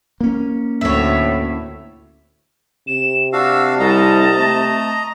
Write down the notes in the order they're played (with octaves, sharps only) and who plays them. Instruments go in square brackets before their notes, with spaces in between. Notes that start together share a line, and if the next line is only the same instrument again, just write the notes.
[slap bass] A#3 C#4
[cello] D2 [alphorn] A2 [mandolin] C#5 E5
[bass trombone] C3 [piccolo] E7
[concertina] D4 F#4 F5 [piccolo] E6
[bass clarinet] C2 [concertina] D#5 A#5 [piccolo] A5
[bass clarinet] A3